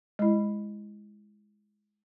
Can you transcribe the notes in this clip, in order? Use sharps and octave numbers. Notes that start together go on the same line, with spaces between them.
G#3 E4